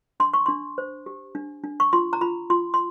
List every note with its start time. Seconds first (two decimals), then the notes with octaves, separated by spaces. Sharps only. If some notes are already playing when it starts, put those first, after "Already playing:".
0.20 D4 C6
0.34 C#6
0.46 D4 C6
0.78 C5
1.06 G4
1.35 D4
1.64 D4
1.80 C#6
1.93 F4 C6
2.13 A#5
2.21 F4 B5
2.50 F4 C6
2.74 C6